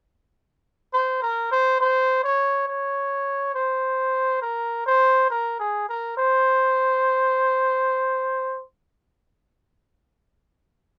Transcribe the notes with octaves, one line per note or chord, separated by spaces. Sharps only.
C5
A#4
C5
C5
C#5
C#5
C5
A#4
C5
A#4
G#4
A#4
C5